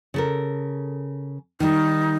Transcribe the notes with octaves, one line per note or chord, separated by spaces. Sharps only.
C#3 A4 A#4
D#3 G3 D#4